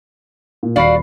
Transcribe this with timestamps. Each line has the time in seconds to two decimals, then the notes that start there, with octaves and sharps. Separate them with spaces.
0.63 A#2
0.76 D#1 F#4 D5 F5 B5 C7